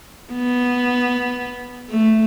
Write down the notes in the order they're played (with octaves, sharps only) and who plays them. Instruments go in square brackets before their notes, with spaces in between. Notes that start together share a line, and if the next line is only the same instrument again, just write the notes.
[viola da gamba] B3
A3